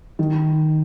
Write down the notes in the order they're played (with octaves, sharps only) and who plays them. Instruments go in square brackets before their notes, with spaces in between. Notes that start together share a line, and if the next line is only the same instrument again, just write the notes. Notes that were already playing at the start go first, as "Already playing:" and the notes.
[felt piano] D#3